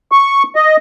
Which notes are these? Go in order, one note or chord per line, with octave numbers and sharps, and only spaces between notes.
C#6
D#5